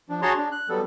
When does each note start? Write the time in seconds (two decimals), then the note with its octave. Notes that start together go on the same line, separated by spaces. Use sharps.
0.09 F3 D4
0.22 F#4 G#4 C#5 A5 A#5 C6
0.37 D4
0.52 F#6
0.69 F#3 G3 B3 A4